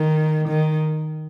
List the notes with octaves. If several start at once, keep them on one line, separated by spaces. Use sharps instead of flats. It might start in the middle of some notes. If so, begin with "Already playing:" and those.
Already playing: D#3
D#3